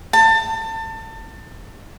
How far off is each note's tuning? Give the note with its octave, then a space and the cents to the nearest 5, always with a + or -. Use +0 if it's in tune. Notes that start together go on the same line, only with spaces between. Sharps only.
A5 +30